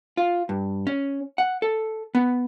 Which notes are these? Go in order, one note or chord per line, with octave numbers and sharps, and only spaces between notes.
F4
G2
C#4
F#5
A4
B3